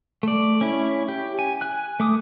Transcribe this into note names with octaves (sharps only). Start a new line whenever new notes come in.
A3 D5
C#4 E4
G4
G#5
G#5 F#6
A3 D6 D#6